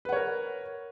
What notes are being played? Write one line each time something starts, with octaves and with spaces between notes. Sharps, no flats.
A#4 B4 C#5 F#5